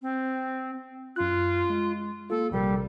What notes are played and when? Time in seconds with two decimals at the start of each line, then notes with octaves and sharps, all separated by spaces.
0.02 C4
1.16 F#2 F4 F#6
1.70 G#3
2.30 A#3 F4 A4
2.51 A#1 C3 G3 A#4